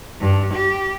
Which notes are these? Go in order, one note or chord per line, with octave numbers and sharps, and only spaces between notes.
G2
G4